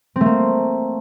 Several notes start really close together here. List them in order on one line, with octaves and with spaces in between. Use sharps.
C4 A3 A#3